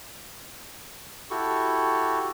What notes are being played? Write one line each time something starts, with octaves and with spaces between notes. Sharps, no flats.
E4 F#4 G4 A4 C#6